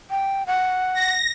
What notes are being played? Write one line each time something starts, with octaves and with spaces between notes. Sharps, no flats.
G5
F#5
A#6